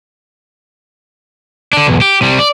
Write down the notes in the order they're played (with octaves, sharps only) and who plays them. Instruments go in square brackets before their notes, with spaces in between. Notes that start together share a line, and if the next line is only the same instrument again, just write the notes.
[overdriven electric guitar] D3 D4
B1 E2
G4
C3 G3
D5